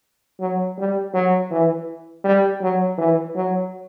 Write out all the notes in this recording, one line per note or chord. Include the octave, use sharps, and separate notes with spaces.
F#3
G3
F#3
E3
G3
F#3
E3
F#3